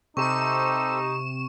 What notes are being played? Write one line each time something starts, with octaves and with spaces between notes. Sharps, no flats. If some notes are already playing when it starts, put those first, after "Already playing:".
C3 D#4 G4 A4 C5 C#6 E7